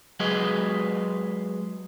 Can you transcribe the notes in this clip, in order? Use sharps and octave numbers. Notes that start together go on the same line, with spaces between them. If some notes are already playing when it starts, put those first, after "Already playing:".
F#3 G#3 F#4 G#4 B4 D#5